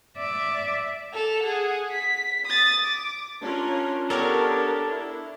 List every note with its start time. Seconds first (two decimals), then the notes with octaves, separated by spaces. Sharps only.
0.17 D5 E5
1.13 A4 F7
1.43 G#4 F#5
1.91 B6
2.46 D#6 A6
2.85 D6
3.41 C#4 D4 F4 A#4
4.10 B3 D4 G4 A4 A#4 C#5
4.91 E4